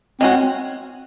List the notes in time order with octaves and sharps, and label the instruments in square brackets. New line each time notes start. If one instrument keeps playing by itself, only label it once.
[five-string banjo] G#3 C#4 F#4 [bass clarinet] C4
[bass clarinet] C4
C4